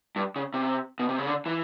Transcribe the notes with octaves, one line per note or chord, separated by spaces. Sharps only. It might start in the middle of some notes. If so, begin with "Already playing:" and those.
G2
C#3
C3
B2
C3
C#3
D3
E3